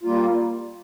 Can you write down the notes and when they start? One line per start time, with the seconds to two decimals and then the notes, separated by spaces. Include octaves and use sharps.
0.03 G3 A#3 F4